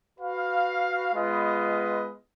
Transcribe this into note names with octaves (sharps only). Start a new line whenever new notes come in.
F#4 B4 F5
G#3 B3 F4 B4 D#5